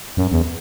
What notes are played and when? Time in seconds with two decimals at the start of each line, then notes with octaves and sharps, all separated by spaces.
0.17 F#2
0.32 E2